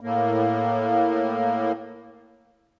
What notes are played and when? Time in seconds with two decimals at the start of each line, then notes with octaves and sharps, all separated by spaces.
0.01 A2 A#3